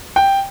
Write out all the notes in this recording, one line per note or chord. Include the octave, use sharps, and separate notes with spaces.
G5